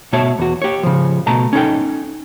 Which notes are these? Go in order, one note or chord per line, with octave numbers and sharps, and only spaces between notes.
B2 A3 C#5 E5 A5
E2 F#4
G4 C#5
C#3 F3
B2 A3 A5 A#5
C#4 D#4 A4 G5